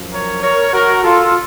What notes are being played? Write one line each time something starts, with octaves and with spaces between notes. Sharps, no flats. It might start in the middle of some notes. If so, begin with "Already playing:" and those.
Already playing: F#2 F3
A#4 C#5
A#4 C#5
F#4 A#4
F4 A4